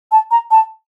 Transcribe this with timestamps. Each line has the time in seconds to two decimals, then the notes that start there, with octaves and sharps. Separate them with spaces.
0.12 A5
0.31 A#5
0.51 A5